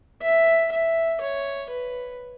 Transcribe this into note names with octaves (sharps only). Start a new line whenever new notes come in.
E5
E5
C#5
B4